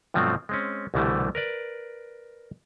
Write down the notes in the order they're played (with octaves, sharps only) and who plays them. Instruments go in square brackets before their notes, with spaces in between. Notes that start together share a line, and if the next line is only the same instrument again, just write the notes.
[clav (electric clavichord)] G2 B2 F3 F#3 A3 C4
G#3 C4 C#4
C2 B2 D3 E3 G3 A3
A#4 B4 D5